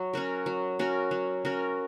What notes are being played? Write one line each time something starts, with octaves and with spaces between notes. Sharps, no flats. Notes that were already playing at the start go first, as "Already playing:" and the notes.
Already playing: F#3
C#4 F#4 A#4
F#3
C#4 F#4 A#4
F#3
C#4 F#4 A#4